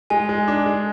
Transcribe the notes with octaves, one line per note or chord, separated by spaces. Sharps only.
G#3 G#5
G#3
D4
G#3